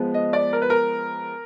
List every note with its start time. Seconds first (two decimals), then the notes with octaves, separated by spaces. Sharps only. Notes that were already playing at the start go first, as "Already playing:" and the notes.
Already playing: F3 G#3 B3
0.14 D#5
0.33 D5
0.53 A#4
0.62 B4
0.70 A#4